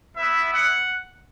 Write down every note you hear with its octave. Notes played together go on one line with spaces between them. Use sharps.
B3 E4 E5
F#5